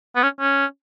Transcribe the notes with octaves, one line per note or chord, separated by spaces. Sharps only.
B3
C#4
C#4